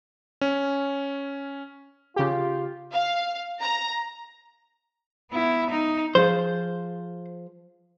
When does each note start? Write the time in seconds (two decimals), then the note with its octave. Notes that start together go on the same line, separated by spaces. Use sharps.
0.41 C#4
2.16 C#3 F4 G4
2.93 F5
3.61 A#5
5.32 B3 E4
5.70 D#4
6.15 F3 G#4 C5 F5